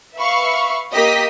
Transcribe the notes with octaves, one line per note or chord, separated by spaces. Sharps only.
B4 E5 F5 B5 C#6
A#3 G4 D#5 D#6 B6